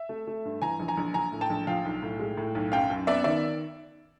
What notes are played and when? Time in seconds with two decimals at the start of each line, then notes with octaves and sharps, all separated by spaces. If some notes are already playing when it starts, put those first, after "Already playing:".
Already playing: E5
0.09 A3
0.27 A3
0.45 G2
0.62 E3 G#5 A#5
0.80 A#1
0.88 G#5 A#5
0.97 A#1
1.14 A#1 G#5 A#5
1.32 A2
1.41 G5 A5
1.50 A#1
1.67 F3 F5 G5
1.85 B1
2.02 A2
2.19 G#3
2.37 A2
2.55 B1
2.72 F#2 F5 G5
2.90 F#2
3.07 B3 D5 E5
3.24 D#3 D5 E5